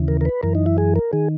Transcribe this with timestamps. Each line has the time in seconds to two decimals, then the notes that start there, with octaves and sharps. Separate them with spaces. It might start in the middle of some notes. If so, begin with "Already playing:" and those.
Already playing: D#2 C#3 E3
0.08 A#4
0.21 A#4
0.25 B4
0.43 F#2 E3 A#4
0.55 D#4
0.66 E4
0.78 G#4
0.96 A#4
1.13 D#3 G#4